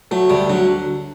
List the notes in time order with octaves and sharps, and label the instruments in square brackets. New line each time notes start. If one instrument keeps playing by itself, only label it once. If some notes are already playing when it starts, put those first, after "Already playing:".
[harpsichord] F#3 [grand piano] A3
[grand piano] D2 [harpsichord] G3
[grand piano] D3 [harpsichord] F#3